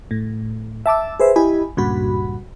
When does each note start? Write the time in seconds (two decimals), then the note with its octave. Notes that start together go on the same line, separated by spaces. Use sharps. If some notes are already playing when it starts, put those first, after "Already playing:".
0.11 A2
0.86 E5 A5 D6 E6
1.20 G#4 B4 C5 E5
1.36 E4 G4 D#5 G#5 B5
1.77 C#2 G2 A#2 F#4 B5